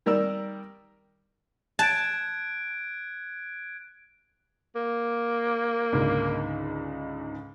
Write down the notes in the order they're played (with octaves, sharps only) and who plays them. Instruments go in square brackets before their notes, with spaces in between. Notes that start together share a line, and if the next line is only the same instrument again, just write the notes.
[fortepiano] D#3 G3 A#4 D5 E6
[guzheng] A5 [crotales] F#6 G#6 D7
[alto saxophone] A#3
[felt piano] C#2 G#2 D3